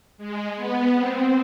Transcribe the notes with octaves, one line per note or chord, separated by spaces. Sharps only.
G#3
B3
C4